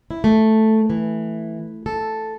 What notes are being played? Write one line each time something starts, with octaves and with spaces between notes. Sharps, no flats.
E4
A3
E3
A4